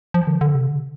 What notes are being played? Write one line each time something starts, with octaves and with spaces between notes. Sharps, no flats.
F3
D3
D3
C3
D3